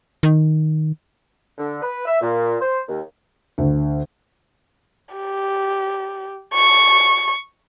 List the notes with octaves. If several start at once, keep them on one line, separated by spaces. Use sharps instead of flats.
D#3
D3
B4
E5
A#2
C5
D#2
D2
G4
C#6